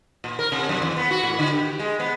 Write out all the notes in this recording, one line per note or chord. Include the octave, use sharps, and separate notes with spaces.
A#2
A#4
C3
F#2
E2
B3
F#4
A2
D3
G4
G#3
B3